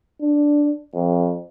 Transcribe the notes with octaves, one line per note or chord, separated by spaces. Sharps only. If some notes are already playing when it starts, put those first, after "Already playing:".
D4
F2